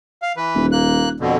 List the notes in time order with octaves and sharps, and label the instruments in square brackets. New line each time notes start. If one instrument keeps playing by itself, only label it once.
[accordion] F5
E3 B4
[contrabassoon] D#1
[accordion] A#3 F#6
F2 B2 D3